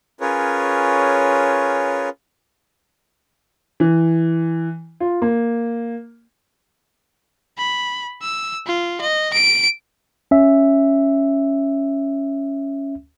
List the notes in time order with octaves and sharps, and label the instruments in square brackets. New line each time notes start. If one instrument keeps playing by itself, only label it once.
[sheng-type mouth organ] C#4 F4 G#4 A#4 B4 C#5
[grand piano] E3
F4
A#3
[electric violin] B5
E6
F4
D#5
D7
[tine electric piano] C#4 E5